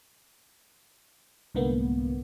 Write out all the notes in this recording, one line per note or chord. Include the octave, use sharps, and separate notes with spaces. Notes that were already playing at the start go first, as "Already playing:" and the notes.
C2 G#2 D3 A#3 B3